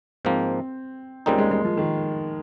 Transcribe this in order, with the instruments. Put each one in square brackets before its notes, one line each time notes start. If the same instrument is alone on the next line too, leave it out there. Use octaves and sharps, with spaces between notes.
[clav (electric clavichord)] G#2 F3 A#3 [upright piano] C4
[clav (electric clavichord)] C#2 C#3 G3 C4 D#4 [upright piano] A#3
[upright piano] G#3
G#3
F3
D#3